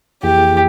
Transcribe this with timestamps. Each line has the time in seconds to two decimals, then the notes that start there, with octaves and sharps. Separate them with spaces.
0.23 F2 E3 A#3 E4 G4 G#4